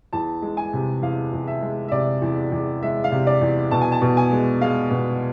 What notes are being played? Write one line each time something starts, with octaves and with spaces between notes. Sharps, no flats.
E2 A5
G#3
G#5
C3
E2 F5
E2
E5
G#3
E5
C3 D5
E2
E2
G#3 E5
F5
C3
D5
E2
B2 A5
G#5
A5
B2
G#5
G#3
G#3 F5
B2